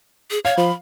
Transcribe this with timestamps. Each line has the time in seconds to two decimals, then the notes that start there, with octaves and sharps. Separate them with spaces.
0.31 G#4
0.45 C#5 F5 G#6
0.57 F3 B5